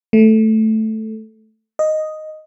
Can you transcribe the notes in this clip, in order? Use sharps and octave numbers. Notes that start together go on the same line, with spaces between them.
A3
D#5